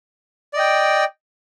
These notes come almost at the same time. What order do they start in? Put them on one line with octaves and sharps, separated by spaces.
D5 D#5 G5